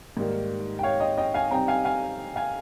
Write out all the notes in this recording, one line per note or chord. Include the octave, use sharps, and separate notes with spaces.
G#2 D#3 G3 A#3
G5
C#5 F5
D#5 G5
D#5 G5
F5 G#5
C3 G3 C4 D#4 G5 A#5
F5 G#5
F5 G#5
F5 G#5